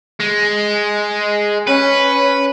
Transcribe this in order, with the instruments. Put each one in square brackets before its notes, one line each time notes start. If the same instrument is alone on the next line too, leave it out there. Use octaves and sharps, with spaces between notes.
[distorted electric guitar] G#3
[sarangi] C#4 [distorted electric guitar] B4